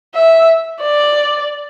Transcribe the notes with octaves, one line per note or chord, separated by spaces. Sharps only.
E5
D5